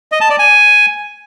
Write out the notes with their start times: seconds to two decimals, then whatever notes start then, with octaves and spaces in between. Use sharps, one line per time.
0.12 D#5
0.21 A5
0.30 D5
0.39 G#5